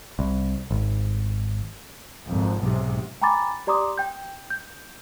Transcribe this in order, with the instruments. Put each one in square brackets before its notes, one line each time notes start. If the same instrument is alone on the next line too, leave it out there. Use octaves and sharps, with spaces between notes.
[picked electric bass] C2
G#1
[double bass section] G#1 F2
B1 G#2 C3
[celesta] G5 G#5 A#5 B5 D6 A6
G4 D5 A#5 C6 D6 D#6
G5 G6
G6